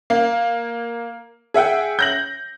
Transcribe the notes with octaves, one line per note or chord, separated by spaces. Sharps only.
A#3
G#4 E5 F#5 G5
G6 A#6 F#7